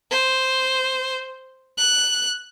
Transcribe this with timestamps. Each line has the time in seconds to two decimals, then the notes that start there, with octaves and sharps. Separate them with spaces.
0.11 C5
1.78 F#6